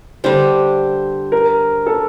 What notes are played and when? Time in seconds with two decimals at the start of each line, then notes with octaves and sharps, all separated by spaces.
0.24 D3 G3 D4 C5
1.32 A#4
1.87 A4